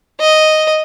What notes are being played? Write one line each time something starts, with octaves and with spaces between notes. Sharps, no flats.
D#5